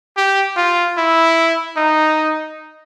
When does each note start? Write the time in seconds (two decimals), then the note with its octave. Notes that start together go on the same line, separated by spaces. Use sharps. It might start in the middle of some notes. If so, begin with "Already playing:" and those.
0.17 G4
0.57 F4
0.97 E4
1.77 D#4